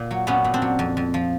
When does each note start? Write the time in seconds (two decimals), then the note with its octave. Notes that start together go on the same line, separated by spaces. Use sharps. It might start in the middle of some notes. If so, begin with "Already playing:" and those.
Already playing: A#2
0.11 F#3
0.27 A#2 B3 C#4
0.44 A#2
0.54 C4 D4
0.62 F#3
0.79 F2
0.97 F2
1.14 F3